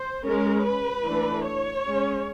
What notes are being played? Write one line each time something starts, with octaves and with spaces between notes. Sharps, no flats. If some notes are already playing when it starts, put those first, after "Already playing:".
Already playing: C5
G#3 C#4 A#4
B4
E3 A3 D4
C#5
G#3 C#4